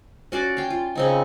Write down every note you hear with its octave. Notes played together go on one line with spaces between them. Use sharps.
C#4 F#4 D5 D6
F5 G5
F4
C#3 C4 D#4